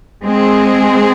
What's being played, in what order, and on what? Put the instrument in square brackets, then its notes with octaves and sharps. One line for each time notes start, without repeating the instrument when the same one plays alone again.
[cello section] G#3 C4 G#4